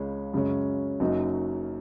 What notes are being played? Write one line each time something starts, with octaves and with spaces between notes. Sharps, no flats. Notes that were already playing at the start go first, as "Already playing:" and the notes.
Already playing: C#2 C#3 G#3 C#4
F#2 C#3 G#3 C#4
F#1 F#2 F#3 D#4